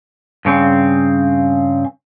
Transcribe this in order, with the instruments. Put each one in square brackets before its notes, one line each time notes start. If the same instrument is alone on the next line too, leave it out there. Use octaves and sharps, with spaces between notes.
[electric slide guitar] G2 C#3 C4